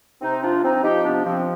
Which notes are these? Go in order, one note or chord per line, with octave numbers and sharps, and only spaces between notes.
C3 C4 D#4
F3 D4 F4
F3 C4 D#4
F3 D#4 G4
C3 B3 D4
F3 C4